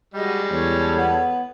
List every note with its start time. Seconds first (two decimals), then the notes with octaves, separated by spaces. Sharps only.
0.14 G3 G#3 F#4 D#5
0.51 E2 A4 C#5
0.98 B3